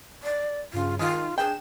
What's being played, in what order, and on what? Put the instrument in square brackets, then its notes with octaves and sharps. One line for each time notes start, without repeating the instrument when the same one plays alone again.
[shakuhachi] D5
[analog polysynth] G2 C#3 [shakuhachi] F4
[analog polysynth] D#3 [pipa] G#3 [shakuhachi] F4
[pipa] D4 G5 [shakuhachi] G#4 [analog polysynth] E7